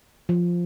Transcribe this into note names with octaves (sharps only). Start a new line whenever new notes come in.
F3